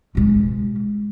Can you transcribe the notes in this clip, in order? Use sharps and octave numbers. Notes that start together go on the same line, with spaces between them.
B2 G#3